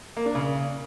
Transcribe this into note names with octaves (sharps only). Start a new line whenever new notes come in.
A#3
D4
C#3